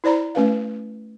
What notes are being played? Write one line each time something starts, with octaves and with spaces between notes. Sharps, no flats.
E4 C5 D5 A#5 B5
A3 C#4 B4 F5